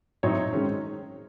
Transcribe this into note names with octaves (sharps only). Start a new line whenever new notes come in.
A2 F#3 C4 D#4 C#5
D#3 G#3 C#4